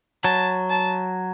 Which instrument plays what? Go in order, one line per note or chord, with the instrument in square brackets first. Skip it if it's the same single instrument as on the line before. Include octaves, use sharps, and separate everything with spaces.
[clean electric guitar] F#3 [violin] A5
[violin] A5